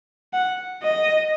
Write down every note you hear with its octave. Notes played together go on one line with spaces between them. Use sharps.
F#5
D#5